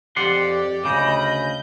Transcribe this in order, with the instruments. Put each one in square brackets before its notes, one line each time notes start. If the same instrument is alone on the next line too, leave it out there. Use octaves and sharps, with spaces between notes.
[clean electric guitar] F2 F#5 C6 [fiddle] G4 [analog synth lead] D5
[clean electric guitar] D2 G2 C#3 [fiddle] D#5 B5 [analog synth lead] G6